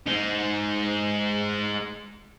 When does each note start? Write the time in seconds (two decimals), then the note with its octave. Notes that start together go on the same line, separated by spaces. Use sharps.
0.07 G#3 D#4